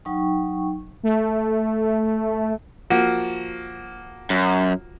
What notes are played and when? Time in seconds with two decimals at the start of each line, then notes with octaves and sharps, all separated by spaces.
0.05 F#3 D#4 G5 C#6
1.03 A3
2.90 F3 A#3 F#4
4.30 F#2